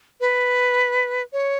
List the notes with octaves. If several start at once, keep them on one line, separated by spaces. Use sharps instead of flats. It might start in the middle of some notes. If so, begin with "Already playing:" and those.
B4
C#5